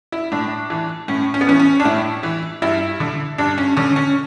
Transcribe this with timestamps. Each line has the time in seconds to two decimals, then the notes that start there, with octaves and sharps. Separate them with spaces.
0.12 E4
0.32 A2 D4
0.70 E3
1.08 A2 C#4
1.34 C#4
1.41 B3
1.47 E3 C#4
1.60 C#4
1.80 D4
1.85 A2 E4
2.23 E3
2.62 G2 E4
3.00 D3
3.38 G2 D4
3.58 C#4
3.77 D3 C#4
3.96 C#4